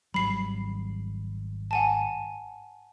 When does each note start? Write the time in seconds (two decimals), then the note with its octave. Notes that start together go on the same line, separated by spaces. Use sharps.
0.14 G#1 F#3 G3 B5 C7
1.71 F#5 G#5 A5